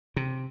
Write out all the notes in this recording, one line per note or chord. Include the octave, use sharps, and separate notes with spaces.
C3